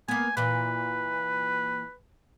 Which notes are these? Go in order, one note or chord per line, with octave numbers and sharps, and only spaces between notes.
A#3 B3 G#5
A#2 E3 B4